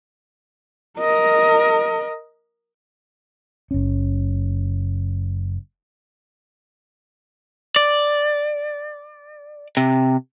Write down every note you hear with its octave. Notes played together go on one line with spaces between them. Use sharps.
A#4 D#5
F#1 C#4
D5
C3